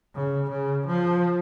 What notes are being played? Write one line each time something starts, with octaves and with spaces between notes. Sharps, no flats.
C#3
C#3
F3